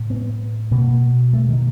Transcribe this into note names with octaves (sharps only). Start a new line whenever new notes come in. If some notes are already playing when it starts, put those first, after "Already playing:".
Already playing: A2
B3
B2 A#3
A3
D#3